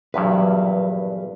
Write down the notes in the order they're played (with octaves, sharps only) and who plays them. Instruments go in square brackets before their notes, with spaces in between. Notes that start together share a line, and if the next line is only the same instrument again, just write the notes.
[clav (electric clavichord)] A#1 E2 G2 [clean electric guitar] F#3 B4